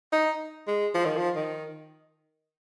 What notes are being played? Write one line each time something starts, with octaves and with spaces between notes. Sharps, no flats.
D#4
G#3
F3
D#3
F3
D#3